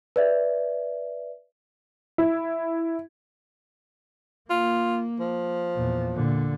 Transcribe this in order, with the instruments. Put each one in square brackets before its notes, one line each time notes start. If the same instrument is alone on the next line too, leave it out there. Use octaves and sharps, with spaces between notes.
[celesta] B4 D5 E5
[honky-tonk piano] E4
[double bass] A#3 [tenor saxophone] F4
[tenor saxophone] F3
[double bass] E2 A#2
A#2 D3